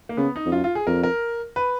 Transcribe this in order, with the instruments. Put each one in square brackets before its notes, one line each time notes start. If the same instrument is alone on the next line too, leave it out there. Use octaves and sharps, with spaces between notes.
[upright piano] A#3
[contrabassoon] C#3 [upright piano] B3
[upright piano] D#4
[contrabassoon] F2
[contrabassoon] F#2 [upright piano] F4
[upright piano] F4
G#4
[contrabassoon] F2 [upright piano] A#4
[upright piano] A#4
B4